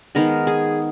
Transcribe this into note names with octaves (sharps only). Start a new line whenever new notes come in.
D#3 G#3 B3 A#4
G#4